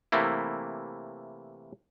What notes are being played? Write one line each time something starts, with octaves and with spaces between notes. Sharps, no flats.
C3 E3 A3 A#3 E4